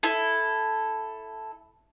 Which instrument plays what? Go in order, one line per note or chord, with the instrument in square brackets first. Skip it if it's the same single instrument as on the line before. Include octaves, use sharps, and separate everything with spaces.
[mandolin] E4 A4